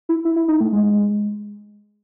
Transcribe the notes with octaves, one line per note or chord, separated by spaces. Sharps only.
E4
E4
E4
D#4
A3
G#3